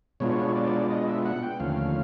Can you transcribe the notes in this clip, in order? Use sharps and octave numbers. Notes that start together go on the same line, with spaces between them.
B2 G#3 B3 D4 F4 C#5
D5
D#5
E5
F#5
G5
D#2 D3 F3 A3 C#4 F5